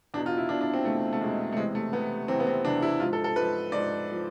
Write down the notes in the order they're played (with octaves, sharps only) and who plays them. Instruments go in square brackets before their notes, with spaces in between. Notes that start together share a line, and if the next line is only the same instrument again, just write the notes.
[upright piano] E2 D4
B2
F4
E4
E2 B2 D4
D4
C4
E2 B2 A3
A3
E2 B2 G#3
A3
E2 C3 E3 G#3
A3
E2 C3 E3 B3
E2 C3 E3 C4
B3
C4
E2 C3 E3 D4
E4
G#2 F3 F4
A4
A4
G#2 F3 B4
G#2 F3 D5
F3